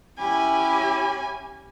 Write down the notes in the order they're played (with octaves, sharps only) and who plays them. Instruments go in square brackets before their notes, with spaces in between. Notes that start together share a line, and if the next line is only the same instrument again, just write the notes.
[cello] C#4 G4 [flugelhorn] E4 [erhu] G#5 [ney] B5